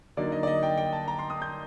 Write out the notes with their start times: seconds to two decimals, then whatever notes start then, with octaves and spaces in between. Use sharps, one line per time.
0.17 D3 F#3 A#3 D#4 D5
0.32 D#5
0.43 D5
0.47 D#5
0.63 G5
0.78 G5
0.93 A5
1.08 A#5
1.19 C6
1.30 D#6
1.42 G6